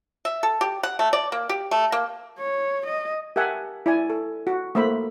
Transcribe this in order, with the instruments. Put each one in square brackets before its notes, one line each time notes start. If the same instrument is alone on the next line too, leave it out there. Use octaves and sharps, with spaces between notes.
[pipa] E5
A4
G4
F#5
A3
D5
A#3
G4
A3
A#3
[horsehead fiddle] C#5
D#5
[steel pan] G4 A#4 E5 F#5 G#5 A5
E4 D5 G#5
A4
F#4
A3 A#3 C5 E5 B5